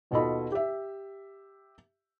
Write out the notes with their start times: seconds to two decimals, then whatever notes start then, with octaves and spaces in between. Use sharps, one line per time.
0.11 D#2 B2 F4 A4 D#5 B5
0.52 G4 E5